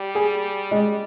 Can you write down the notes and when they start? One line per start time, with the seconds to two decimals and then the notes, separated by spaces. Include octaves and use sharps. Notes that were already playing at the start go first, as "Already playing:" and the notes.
Already playing: G3
0.15 G#4
0.71 G#3